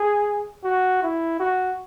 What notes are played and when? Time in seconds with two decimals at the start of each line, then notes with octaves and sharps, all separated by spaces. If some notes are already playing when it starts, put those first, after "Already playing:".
Already playing: G#4
0.64 F#4
1.03 E4
1.40 F#4